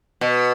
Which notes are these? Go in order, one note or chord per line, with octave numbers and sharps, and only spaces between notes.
B2